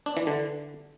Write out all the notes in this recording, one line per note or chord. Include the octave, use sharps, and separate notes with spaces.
D4
E3
D3